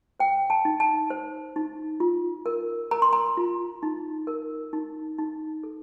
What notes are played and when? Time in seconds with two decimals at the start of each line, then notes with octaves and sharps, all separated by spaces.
0.20 C5 G5
0.50 A5
0.65 D#4
0.80 A5
1.10 C5
1.56 D#4
2.00 F4
2.46 A#4
2.91 A#4 A#5
3.02 C6
3.13 A#5
3.37 F4
3.83 D#4
4.27 A#4
4.73 D#4
5.18 D#4
5.63 A4